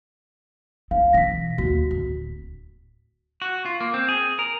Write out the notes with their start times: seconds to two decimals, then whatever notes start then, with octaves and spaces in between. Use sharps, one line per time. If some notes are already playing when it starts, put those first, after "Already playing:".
0.91 C4 F5
1.13 B2 E3 A#6 B6
1.58 D#2 F#4 B6
1.91 D1
3.42 F#4
3.65 F4
3.81 A#3
3.94 C4
4.09 G#4
4.39 A#4